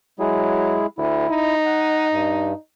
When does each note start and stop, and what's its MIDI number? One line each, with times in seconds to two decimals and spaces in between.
0.19 0.82 54
0.19 0.86 56
0.19 0.86 64
0.19 0.86 68
0.98 1.26 38
0.98 1.55 64
1.29 2.56 63
1.66 2.08 78
2.12 2.53 43